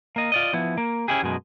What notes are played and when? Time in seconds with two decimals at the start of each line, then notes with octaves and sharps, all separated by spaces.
0.16 A#3 D#5
0.32 F4 D5 D#5
0.53 F3 B3 E4
0.78 A#3
1.08 C#4 D4 E4 G4 G#4
1.23 F#2 B2 G#3